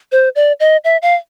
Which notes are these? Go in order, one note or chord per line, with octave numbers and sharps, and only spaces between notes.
C5
D5
D#5
E5
F5